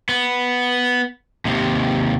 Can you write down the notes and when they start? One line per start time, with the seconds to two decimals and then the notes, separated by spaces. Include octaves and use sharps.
0.09 B3
1.45 D#2 C3